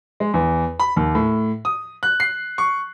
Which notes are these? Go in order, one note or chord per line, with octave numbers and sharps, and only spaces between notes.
G#3
E2
B5
D#2
A2
D#6
F#6
C7
C#6